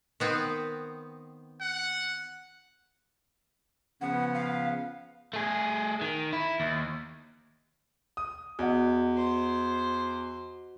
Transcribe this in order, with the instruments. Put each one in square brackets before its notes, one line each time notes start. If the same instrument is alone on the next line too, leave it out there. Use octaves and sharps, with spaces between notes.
[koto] D#3 B3 C4
[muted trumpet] F#5
[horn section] C#3 F3 B3 [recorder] F#5
[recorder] F5
[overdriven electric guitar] A3 G#4
D#3
E4
D#2
[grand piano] D#6
[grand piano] E2 [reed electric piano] F#4 D#5 F#5
[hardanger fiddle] C5